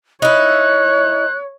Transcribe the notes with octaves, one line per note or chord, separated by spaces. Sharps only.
D#4 E4 C#5 F#6